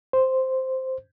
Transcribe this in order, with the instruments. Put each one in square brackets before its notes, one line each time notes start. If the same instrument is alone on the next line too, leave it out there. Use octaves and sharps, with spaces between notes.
[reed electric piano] C5